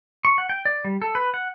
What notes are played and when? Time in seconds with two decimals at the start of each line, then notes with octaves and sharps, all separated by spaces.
0.25 C#6
0.38 F#5
0.49 G5
0.65 D5
0.84 G3
1.02 A4
1.15 B4
1.34 F#5